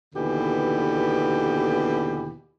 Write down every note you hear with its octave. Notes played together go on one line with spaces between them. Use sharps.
D#2 B2 D3 E3 B3 G4